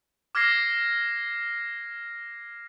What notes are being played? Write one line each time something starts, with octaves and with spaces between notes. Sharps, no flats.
D6 F6 G#6 A#6 C7